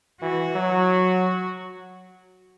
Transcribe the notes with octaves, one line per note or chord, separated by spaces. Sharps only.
E3 F#4
F#3